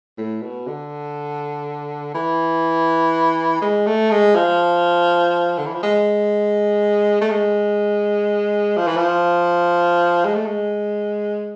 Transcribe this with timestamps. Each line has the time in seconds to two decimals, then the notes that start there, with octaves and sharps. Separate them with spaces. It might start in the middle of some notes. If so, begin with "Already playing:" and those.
0.18 A2
0.42 B2
0.67 D3
2.14 E3
3.62 G#3
3.86 A3
4.11 G#3
4.35 F3
5.58 D3
5.66 E3
5.75 F3
5.83 G#3
7.21 A3
7.30 G#3
8.77 F3
8.87 E3
8.97 F3
10.25 G#3
10.35 A3
10.46 G#3